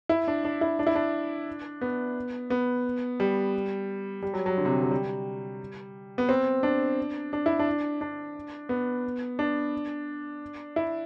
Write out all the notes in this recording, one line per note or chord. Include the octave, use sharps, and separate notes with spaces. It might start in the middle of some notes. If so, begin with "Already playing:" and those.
E4
D4
D4
E4
D4
E4
D4
B3
B3
G3
G3
F#3
F#3
D3
C3
F#3
G3
B3
C4
D4
D4
E4
D4
D4
B3
D4
E4